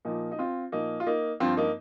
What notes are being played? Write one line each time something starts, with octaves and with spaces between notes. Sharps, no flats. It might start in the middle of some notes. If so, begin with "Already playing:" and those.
A#2 F3 A#3 D#4
D#4
C4 F4
A#2 F3 A#3 D#4
F4
A#3 D#4
G2 F3 C4 F4
A#3 D#4